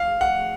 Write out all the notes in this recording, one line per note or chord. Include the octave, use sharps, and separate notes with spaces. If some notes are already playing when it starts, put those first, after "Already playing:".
Already playing: F5
F#5